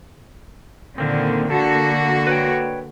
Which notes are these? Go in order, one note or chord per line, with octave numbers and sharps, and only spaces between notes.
A#2 D3 D#3 A#3 C4
D3 A#3 F#4 A4
B4 C#5 G5